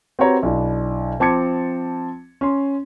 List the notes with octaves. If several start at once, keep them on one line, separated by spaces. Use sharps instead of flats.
C4 F#4 G4 B4 C#5 A#5
B1 D4 E4
F3 C4 A5 D6 G#6 C#7
C#4 C6